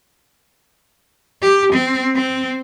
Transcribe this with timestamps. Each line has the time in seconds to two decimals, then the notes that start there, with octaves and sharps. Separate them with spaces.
1.42 G4
1.72 C4
2.15 C4